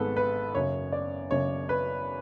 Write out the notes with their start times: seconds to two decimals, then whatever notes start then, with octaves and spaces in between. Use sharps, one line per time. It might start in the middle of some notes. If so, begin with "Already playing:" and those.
Already playing: G#1 G#2 G#3 B3 A4 B4
0.17 B4
0.54 F#1 F#2 C#3 C#5
0.92 D5
1.31 F#1 F#2 C#3 C#5
1.69 B4